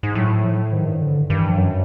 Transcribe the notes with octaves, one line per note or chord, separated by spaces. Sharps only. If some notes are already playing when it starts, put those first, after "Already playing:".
G#2
A2 F#3
F3
G#2 D#3
G2
D3
G2 D#3
E3
F3
F#2 F#3